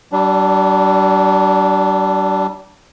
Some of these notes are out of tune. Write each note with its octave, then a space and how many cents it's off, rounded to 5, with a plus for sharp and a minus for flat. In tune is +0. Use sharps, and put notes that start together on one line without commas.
G3 -40 D4 +0